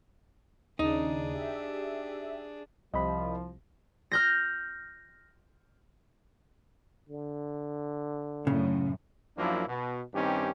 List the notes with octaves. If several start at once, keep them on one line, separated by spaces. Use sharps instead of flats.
D#2 C#3 D4 D#4 G#4
G4 E5
C2 F3 D#5 B5
F6 G6 A#6
D3
F#2 A2 C#3
F#2 F3 F#3 A#3 D4 E4
B2
G2 D#3 C4 C#4 D#4 G4